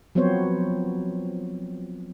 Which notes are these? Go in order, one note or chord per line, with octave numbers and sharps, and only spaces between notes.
F3 F#3 B3 C4 C5 C#5